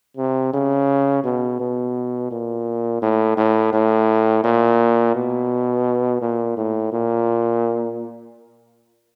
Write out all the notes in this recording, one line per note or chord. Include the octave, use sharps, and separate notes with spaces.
C3
C#3
B2
B2
A#2
A2
A2
A2
A#2
B2
A#2
A2
A#2